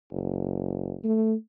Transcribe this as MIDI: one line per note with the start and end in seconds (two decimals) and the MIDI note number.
0.12 0.96 30
1.04 1.34 57